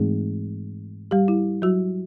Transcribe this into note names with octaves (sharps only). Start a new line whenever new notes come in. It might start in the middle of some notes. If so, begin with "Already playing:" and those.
Already playing: G#2 E3 G#3 A3 C4 D#4 G#4
G3 G4
E4
F#3 F#4